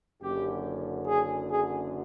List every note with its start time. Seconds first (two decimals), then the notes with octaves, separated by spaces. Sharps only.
0.21 F#1 F#2 D3 G4
1.06 G#4
1.48 G#4